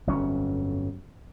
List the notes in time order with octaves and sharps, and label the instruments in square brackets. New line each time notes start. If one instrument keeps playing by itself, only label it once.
[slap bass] G1 F2 F#3 C#4